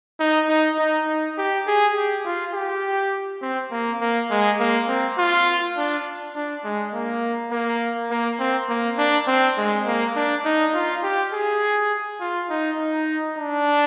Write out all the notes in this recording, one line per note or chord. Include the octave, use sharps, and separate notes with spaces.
D#4
D#4
D#4
D#4
G4
G#4
G4
F4
G4
C4
A#3
A#3
G#3
A#3
C4
F4
D4
D4
G#3
A#3
A#3
A#3
C4
A#3
D4
C4
G#3
A#3
D4
D#4
F4
G4
G#4
F4
D#4
D#4
D4